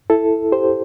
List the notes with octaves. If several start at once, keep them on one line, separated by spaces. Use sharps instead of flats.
E4 A4
G4 C5